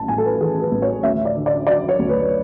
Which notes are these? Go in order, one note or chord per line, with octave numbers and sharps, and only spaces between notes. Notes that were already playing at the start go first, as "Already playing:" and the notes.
Already playing: A1 A5
A2 G#5
A4
B4
E3 G#4
B4
A1
C#5
D2 E5
D5
D3
D5
F#3 D5
C#5
D2
B4